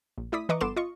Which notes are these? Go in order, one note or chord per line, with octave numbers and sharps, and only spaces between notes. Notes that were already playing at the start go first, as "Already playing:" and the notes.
A#1
A3 E4 D5 D#6 B6
E3 B4 D#5 A#5 C#6 D6
G1 B3 A4 C6 D6 E7
F4 D#5 C#6